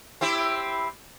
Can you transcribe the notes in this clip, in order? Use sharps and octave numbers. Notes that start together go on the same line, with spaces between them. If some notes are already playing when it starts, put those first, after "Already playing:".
C4 E4 G4